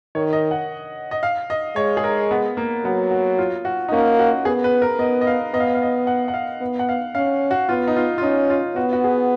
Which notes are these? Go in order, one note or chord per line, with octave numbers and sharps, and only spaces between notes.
D#3 C#5
D#5
F#5
D#5
F5
D#5
G#3 C#5
G#4
A#4
B3
A#3
F#3 B3
F#4
F4
F#4
D#4
A#3 C#4
F#4
B3 G#4
B4
A#4
B3 D#5
D#5
F5
B3 D#5
F5
D#5
F5
D#5
F#5
F#5
F5
B3
F#5
F5
C#4 F5
F#4
B3 F4
D#4
F4
F4
C#4 D#4
F4
B3 F#4
F#4
G#4